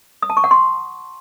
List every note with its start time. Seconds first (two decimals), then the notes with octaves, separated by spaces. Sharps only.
0.23 D#6
0.30 A5
0.37 C#6
0.44 F#5
0.51 C6